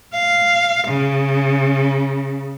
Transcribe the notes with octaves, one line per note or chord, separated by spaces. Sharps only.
F5
C#3